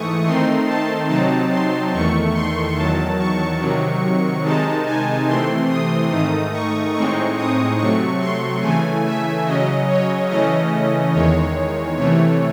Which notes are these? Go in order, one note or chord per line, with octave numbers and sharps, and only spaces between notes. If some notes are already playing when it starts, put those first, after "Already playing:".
Already playing: G#2 E3 A3 C#6 D#6
D#3 A3 C4 D#4 C6
A5
C3 F#3 C4 D#4 A5
C6
E2 D#3 A3 C#6
C6
E2 D#3 F#3 A5
C#6
C3 D#3 F#3
C3 D#3 G#3 D#4 A5
G#5
C3 E3 A3 C4 C6
D#6
G#2 D#3 A3 D#4 D#6
C#6
A2 G#3 C4 D#4 C#6
D#6
C3 F#3 A3 C#6
C6
C#3 E3 A3 G#5
E5
C#3 F#3 C#4 D#5
C#5
C#3 E3 A3 C#4 D#5
E2 D#3 G#3 C#5
C3 E3 A3 C#5